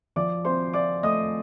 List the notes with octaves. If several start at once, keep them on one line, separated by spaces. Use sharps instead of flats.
F3 D5 D6
C4 C5 C6
F4 D5 D6
A3 D#5 D#6